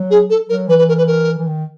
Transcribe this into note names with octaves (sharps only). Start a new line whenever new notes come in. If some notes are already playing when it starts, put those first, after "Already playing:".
Already playing: F#3
G#4
A4
F#3 A#4
E3 B4
B4
A#4
B4
A#4
E3
D#3